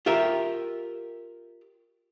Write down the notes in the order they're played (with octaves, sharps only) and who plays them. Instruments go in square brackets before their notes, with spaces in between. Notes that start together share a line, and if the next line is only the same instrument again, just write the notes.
[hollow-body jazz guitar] F4 G4 A#4 E5